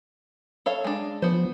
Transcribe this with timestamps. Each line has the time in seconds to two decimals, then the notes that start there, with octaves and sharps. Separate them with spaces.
0.66 A4 C#5 F5
0.84 G#3 D4
1.22 F3 B3 C5